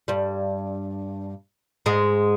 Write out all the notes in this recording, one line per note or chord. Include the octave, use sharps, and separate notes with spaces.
G2 G3
G#2 G#3